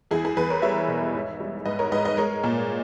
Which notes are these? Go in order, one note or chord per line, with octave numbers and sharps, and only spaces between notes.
E2 E4 G#4
E4 G#4
E2 G#4 B4
A#4 C#5
G3 C#5 E5
B2
G#2
G3
G#2 B4 D#5
A#4 C#5
G#2 B4 D#5
B4 D#5
G#3 A#4 C#5
A#2